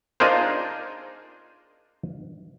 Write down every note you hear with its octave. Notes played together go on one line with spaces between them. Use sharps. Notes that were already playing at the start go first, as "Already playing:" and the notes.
D4 D#4 F4 G#4 A#4 C5